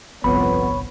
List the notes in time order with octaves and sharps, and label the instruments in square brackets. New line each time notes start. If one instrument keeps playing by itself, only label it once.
[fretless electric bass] G1 C2 [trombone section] F2 B3 [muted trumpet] C#5 [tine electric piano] B5